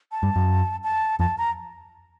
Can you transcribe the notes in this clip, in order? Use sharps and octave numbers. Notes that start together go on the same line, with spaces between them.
A5
G2
F#2
A5
F2 A5
A#5